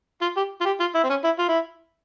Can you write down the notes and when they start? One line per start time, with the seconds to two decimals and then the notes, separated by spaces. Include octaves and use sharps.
0.21 F4
0.37 G4
0.61 F4
0.65 G4
0.80 F4
0.95 E4
1.03 C4
1.09 C#4
1.24 E4
1.38 F4
1.48 E4